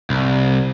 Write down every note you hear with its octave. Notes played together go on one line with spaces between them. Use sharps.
C2